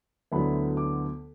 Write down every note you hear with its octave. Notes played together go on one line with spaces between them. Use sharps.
D2 D3 F#3 B3 E4 B5
D6